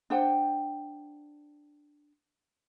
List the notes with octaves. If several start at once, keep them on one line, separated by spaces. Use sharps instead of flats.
D4 C5 F#5 G5